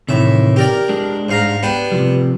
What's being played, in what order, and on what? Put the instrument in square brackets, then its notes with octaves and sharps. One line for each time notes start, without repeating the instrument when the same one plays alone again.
[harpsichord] A2 E5 [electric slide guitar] C3 D#3 E3
[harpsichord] G4 A#4 D5
[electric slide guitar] G#3 D4
[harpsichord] G#2 F5 A#5
B3 D4 G4
[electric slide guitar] C3 F3 G3